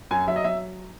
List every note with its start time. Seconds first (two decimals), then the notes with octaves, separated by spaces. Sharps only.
0.11 F#2 G#5
0.27 F#3 E5
0.36 D#5
0.44 F#3 E5